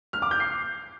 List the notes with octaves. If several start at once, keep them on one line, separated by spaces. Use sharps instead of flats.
F6
D6
G6
C7